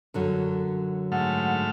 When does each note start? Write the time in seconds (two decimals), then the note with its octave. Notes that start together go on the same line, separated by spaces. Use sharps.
0.14 F#2 D3 F#3
1.12 G#2 A3 F#5 F6